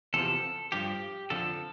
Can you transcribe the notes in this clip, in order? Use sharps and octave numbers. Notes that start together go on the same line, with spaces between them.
E2 C3 F3 A4
G2 F3 G4
F2 D3 F3 A4